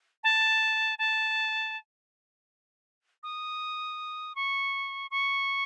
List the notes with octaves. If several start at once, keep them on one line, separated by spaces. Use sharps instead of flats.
A5
A5
D#6
C#6
C#6